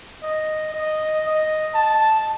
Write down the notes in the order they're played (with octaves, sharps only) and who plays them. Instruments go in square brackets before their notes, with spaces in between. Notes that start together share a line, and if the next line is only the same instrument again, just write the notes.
[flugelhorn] D#5
D#5
D#5
A5